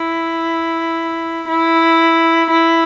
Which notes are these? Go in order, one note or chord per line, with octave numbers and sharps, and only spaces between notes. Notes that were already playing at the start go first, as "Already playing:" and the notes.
Already playing: E4
E4
E4